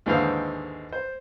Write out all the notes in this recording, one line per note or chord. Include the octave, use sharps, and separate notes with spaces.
D#2 G#2 D3 E3 C5 F5
C5